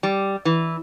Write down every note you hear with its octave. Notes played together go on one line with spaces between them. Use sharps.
G3
E3